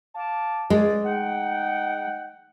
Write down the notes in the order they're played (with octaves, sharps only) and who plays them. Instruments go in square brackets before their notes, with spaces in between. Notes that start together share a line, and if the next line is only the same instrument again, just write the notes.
[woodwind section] F5 A5 D6
[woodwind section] C#2 D5 [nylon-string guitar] G#3
[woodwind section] D#4 F#5 G5